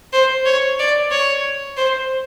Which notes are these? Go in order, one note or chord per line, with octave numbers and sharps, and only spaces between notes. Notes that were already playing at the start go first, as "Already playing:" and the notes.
C5
C#5
D5
C#5
C5